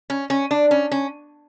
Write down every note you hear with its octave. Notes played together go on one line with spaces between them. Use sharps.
C#4
C#4
D4
C#4
C#4